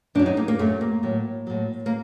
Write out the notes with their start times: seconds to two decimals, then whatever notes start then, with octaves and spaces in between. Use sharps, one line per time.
0.15 F#2 F#3 D4
0.26 D#4
0.37 A#3
0.48 A#3
0.59 F#2 F#3 A3
0.81 A#3
1.03 A2 F#3
1.47 A2 F#3
1.86 A#3